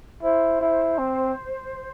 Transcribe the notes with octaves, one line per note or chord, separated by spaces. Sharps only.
E4 C5
E4
C4